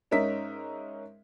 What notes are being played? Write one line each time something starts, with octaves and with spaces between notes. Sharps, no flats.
G#2 C#4 D#4 A#4 E5 B6